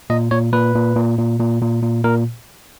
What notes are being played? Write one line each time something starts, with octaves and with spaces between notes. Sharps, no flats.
A#2 D#5
A#2 C#5
A#2 B4
A#2
A#2
A#2
A#2
A#2
A#2
A#2 A#4